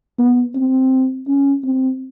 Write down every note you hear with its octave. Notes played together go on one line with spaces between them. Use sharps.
B3
C4
C#4
C4